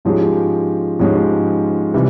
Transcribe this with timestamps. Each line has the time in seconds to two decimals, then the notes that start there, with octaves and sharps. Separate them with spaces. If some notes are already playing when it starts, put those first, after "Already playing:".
0.05 G#2 F3 G#3 C#4 G4
0.99 G#2 F3 G#3 C#4 G4
1.94 C3 E3 G3